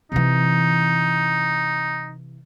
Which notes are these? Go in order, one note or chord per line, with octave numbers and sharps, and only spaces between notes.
C3 E3 D#4